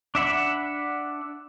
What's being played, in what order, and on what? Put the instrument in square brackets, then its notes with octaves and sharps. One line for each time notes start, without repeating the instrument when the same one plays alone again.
[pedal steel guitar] D4 E5 F#5 B5